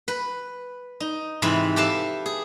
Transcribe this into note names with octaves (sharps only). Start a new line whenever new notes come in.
B4
D#4
G#2 C3 E3 B4 B5
G4 A4 B4 E5 F5
G#4